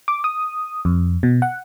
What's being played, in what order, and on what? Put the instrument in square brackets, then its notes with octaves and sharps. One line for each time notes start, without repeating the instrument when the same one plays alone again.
[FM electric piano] D6
D#6
F2
B2
F#5